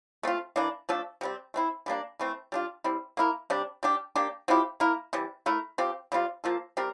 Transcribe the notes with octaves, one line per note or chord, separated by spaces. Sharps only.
A3 C4 F4
E3 A#3 D4
F3 A3 D4 A4
C3 G3 C4
A3 C4 E4
E3 G3 A#3 D4
E3 A3 C4
G3 D4 F4
G3 C4 E4
A#3 E4 A#4
C3 G3 D4
G3 D4 G4
A#3 D4 G4
F3 C4 E4 G4
A#3 E4 A#4
C3 E3 G3
A3 E4 A#4
F3 C4 G4
C3 G3 C4 F4
F3 A#3 F4 A4
G3 C4 G4 A#4